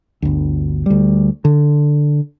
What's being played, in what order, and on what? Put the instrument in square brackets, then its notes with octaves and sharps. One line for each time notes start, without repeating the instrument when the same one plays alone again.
[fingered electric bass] G1 D2
D2 G3
D3